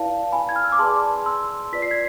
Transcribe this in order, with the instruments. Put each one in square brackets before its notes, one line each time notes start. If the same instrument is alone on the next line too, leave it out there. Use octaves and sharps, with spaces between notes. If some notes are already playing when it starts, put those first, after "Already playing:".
Already playing: [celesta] E4 B4 D5 F5 A5
G#5 B5
G#6
F6
E6
D6
G#4 B4 D5 A5 C6
C6 E6
F4 B4 D5 B6
C7
G#6 B6